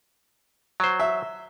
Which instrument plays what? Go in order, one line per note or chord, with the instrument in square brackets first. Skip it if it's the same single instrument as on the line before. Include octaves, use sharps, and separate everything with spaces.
[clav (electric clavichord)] F#3 C5
[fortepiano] E5